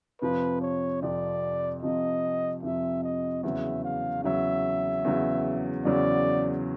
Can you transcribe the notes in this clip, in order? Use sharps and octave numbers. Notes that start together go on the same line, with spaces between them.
F2 C3 F3 B4
C#5
F2 C3 F3 D5
F2 C3 F3 D#5
F2 C3 F3 E5
D#5
E2 C#3 F#3 E5
F5
E2 C#3 F#3 E5
E2 C#3 F#3
E2 C#3 F#3 D5